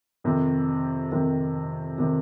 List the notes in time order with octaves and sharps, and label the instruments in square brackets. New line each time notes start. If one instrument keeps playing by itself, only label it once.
[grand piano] F2 C3 D#3
F2 C3 D#3
C3 D#3